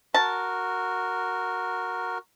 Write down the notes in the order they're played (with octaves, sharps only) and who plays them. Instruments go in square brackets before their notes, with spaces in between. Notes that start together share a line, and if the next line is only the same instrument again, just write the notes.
[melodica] F#4 A#4 [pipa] A5